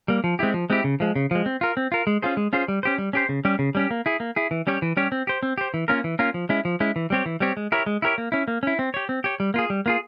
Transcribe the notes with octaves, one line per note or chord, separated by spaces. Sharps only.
G3 A#3
F3
G#3 C4 E4 G4
F3
G#3 C4 E4 G4
C#3
F3 G#3
C#3
F3 G#3
C4
F4 A#4
C4
F4 A#4
G#3
C#4 F4 G#4 C5
G#3
C#4 F4 G#4 C5
G3
C#4 G4 C5
G3
C#4 G4 C5
C#3
G3 C#4 G4
C#3
G3 C#4 G4
A#3
E4 G#4
A#3
E4 G#4
E3
G3 C#4 G4 C#5
E3
G3 C#4 G4 C#5
C4
G4 C5
C4
G4 C5
E3
A#3 C#4 F4 A#4
E3
A#3 C#4 F4 A#4
F3
G#3 C#4 E4
F3
G#3 C#4 E4
E3
G3 C4 G4 C#5
E3
G3 C4 G4 C#5
G#3
E4 G4 A#4 C#5
G#3
E4 G4 A#4 C#5
A#3
C#4 E4
A#3
C#4 E4
C4
G4 C#5
C4
G4 C#5
G3
A#3 F4 G#4
G3
A#3 F4 G#4